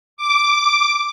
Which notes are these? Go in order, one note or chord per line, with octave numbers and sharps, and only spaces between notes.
D6